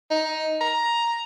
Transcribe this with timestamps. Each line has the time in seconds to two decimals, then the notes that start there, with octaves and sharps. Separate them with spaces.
0.11 D#4
0.61 A#5